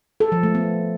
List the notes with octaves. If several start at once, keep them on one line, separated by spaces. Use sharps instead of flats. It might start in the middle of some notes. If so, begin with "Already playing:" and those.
A4
F3
A3
B3